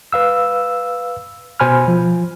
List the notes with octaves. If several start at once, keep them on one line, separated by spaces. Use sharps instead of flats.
B4 F5 E6
B2 C5 G#5 B5 F6
F3